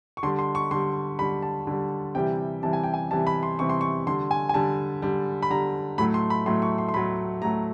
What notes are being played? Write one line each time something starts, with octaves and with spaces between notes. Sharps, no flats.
C#6
D3 G3 C6
C6
C#6
D3 G3 C6
D3 G3 B5
A5
D3 G3
C3 E3 G3 G5
C3 E3 G3 A5
G#5
G5
G#5
C3 E3 G3 A5
B5
C6
C3 E3 G3 C#6
C6
C#6
D3 G3 C6
G#5
G#5
D3 G3 A5
D3 G3
B5
D3 G3 A#5
A2 F#3 A3 B5
C6
B5
A2 F#3 A3 C6
C#6
C6
C6
A2 F#3 A3 B5
A2 F#3 A3 A#5